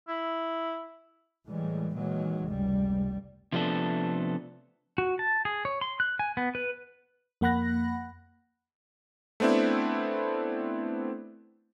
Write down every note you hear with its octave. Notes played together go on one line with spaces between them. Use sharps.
E4
A2 E3 G3 G#3
A#2 D#3 E3 F#3 G#3
F1 C#2 G2 G3
C3 F3 A3 B3 D4 A4
F#4
A5
G#4
C#5
C6
F#6
G#5
B3
B4
F2 A#3 F#5 B5 F#6 A#6
A3 B3 C4 D4 E4